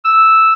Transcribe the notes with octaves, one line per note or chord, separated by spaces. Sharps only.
E6